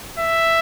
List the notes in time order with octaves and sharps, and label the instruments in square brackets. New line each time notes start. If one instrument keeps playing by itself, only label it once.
[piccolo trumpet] E5